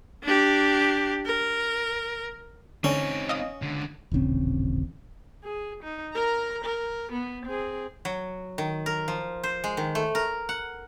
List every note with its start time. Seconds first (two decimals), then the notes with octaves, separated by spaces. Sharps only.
0.24 D4 G4
1.26 A#4
2.84 D3 C4 C#4 D#4
3.29 D#5 F5 D#6
3.62 C#2 D3
4.12 D#1 A1 C#3 C4
5.44 G#4
5.83 D#4
6.13 A#4 A#5
6.65 A#4
7.12 B3
7.46 C4 G#4
8.05 F#3
8.58 D#3
8.86 A#4
9.08 F3
9.44 C5
9.64 G#3
9.77 D#3
9.95 A3
10.15 A#4
10.49 F#5